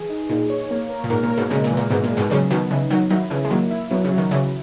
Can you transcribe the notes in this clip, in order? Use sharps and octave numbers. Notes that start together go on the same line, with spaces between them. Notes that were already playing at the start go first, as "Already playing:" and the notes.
Already playing: E3 G#4
D#4
A#2 D#4
C#5
A#3
A#4
A#2
G#2 A#4
A#2
A#4
G#2 B2
A#2 C#3 G#3
A#2
E3
A#2
G#2 B2 E3
A#2
G#3
G#2 B2
A#2 C#3 F#3
B2 D#3 B3
C#3 E3 D#4
D#3 F#3 D#4
D#3 F#3 E4
C#3 E3 E4
G#3
D#3 F#3 A#3
E4
B2 F#3
C#3
F#3
D#3
C#3 E3 F#3